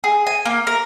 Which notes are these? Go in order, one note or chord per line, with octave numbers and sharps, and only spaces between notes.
G#4
G#5
A#3
A#4